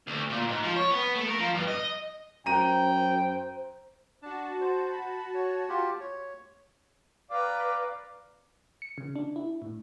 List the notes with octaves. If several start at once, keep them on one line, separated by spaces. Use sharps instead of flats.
D2
A#2
G#2
F3
C#5
B3
A3
A#4
F3
G2
D#5
F#2 C5 G5 A#5 D#7
D4 F#4 A5
C5
B5
C#5
F4 G4
C#5
B4 D5 F5 G5 A#5 D6
C#7
C#3
D4
E4
A2